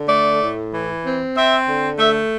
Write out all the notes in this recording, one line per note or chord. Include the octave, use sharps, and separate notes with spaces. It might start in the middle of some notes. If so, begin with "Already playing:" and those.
Already playing: D3
A3 D5
A2
E3
C4
C4 E5
D3
A3 E5